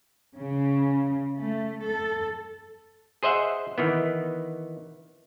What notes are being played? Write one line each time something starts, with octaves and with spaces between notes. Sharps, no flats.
C#3
A3
A4
G#4 C5 D#5 E5 F#5
D#3 E3 B3